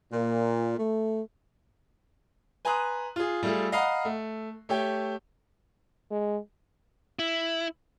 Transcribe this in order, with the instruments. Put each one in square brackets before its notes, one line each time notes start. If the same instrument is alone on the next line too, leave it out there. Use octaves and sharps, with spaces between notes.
[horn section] A#2
A3
[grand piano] B4 G#5 A#5 C6 D#6 F#6
F4 G#4
G3 A3 F4 G#4 A4
D#5 F5 F#5 A#5 B5
A3
A3 G4 C#5 G5
[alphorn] G#3
[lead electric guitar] E4